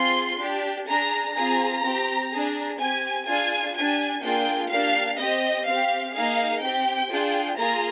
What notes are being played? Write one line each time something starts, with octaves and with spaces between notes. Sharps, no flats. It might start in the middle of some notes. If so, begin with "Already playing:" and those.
Already playing: C4 F4 G#4 C6
D4 G4
D4 G#4 A#5
C4 F4 G#4 A#5
C4 G4
D4 G#4
C4 G4 G#5
D4 F4 G#4 G#5
D4 G4 G#5
A#3 D4 F4 G#4 G5
A#3 D4 G4 F5
C4 G4 D#5
C4 G4 F5
A#3 D#4 G#4 F5
C4 G4 G5
D4 F4 G#4
A#3 F4 G#4 A#5